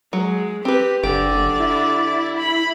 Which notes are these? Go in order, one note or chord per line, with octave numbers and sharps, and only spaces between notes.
F#3 G#3
C4 G4 B4
F#1 D3 G4 D5
E4
B5